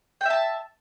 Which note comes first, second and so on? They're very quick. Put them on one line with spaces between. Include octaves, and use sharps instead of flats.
G5 E5 A5